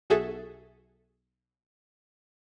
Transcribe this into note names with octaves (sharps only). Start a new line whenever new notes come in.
B1 F#4 G#4 A4 E5